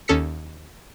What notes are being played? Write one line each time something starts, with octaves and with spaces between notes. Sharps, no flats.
D#2 C#4 A4 F6 B6 C#7